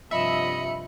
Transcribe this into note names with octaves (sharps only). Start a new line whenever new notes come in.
G2 C3 F3 D#5 E5 B5 C#7